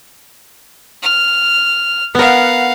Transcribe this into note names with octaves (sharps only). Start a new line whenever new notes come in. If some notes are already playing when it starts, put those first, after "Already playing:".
F6
B3 A#4 F5 F#5